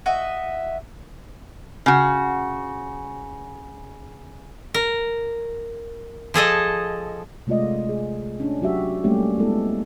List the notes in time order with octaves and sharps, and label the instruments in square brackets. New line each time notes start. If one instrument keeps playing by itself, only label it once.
[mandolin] F#4 D#5 E5
[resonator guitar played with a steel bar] C#3 F#4
[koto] A#4
F3 G#4 A4 D#5
[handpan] C3 G#3 A3 F4 D5 D#5
G#4
C#4 D4
F#3 F#4 G4 E5
G3 A3 A#3 C#4 G4
G#3 A3 B3 E4 A4